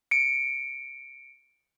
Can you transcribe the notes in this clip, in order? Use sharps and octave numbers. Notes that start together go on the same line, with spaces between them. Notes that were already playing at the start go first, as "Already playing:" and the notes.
C#7 D7